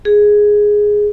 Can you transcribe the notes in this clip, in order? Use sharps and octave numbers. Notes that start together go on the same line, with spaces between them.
G#4